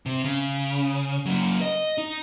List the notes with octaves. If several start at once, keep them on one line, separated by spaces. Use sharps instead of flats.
C3
C#3
F#3 A#3
D#5
D#4